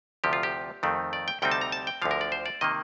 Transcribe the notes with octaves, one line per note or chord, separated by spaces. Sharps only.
D2 C3 F3 G4
F4
G4
F2 D#3 A3 C4
D5
G5
D2 C3 G3 C4 D#4 G5
A5
A#5
A5
G5
D2 D3 F3 F5
A#4
D5
C5
D5
C3 D#3 A#3 D#5